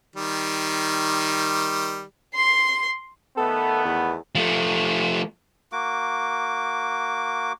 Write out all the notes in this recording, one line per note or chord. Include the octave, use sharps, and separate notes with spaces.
D#3 G3
C6 C7
D#3 A3 B3 A4
E2
F3 A3
A#3 F#4 D6